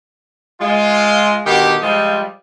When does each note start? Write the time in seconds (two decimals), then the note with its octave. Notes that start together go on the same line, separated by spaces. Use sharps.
0.60 G#3 F4
1.45 B2 D3 D#3 G4
1.82 F3 G3 G#3 F4